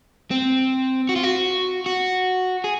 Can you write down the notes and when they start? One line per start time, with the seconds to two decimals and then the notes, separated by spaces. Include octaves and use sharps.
0.31 C4
1.09 F#4
1.16 F4
1.23 F#4
1.86 F#4
2.64 G#4